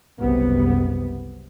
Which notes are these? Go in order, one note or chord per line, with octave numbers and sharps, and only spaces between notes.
F#1 C2 C3 B3